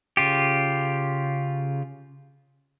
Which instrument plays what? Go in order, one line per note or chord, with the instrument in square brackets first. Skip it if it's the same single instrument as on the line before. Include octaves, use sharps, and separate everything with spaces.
[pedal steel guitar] C#3 F4 G4